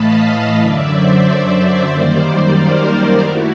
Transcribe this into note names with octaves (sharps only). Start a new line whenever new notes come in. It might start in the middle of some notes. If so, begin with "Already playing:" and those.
Already playing: A2 E3 A3 D#5 F5 A5 B5
F#2 D3 F#3 D5 E5
C5 D5
F#2 D#3 G3 A#3
A#4 C5
A3 E4 F#4